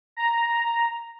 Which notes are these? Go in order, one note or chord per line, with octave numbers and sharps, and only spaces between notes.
A#5